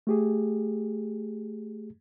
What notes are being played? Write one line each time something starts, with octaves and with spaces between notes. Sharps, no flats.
A3 G4 G#4